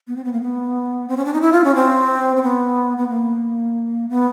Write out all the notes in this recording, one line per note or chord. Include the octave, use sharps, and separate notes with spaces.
B3
C4
B3
A#3
B3
C4
C#4
D4
D#4
E4
F4
C#4
C4
C4
B3
B3
A#3
B3